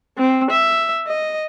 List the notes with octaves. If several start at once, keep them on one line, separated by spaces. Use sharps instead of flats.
C4
E5
D#5